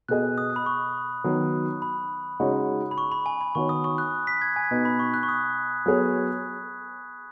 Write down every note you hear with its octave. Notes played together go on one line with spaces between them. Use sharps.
B2 B3 G#4 D#5 F#6
D#6
B5
C#6
D#3 F#3 B3
B5
C#3 G#3 D#4 F#4 C#5
B5
C#6
B5
G#5
B5
D#3 B3 F#4 C#5 C#6
D#6
C#6
F#6
B6
G#6
G#5
B2 B3 D#4 B4
B5
C#6
F#6
C#6
D#6
F#3 B3 G#4 C#5